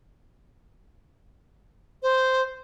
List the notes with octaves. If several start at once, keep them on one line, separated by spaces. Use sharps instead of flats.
C5